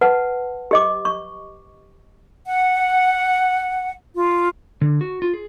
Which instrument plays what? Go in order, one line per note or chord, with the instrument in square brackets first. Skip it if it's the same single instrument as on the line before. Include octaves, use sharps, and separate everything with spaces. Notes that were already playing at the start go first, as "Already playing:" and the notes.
[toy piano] B4 F#5 A5
G4 D#5 D6
C#6
[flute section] F#5
F4
[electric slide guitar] D3
F#4
F4
G#4